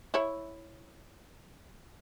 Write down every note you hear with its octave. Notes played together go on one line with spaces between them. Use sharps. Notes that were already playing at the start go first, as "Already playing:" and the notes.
E4 C#5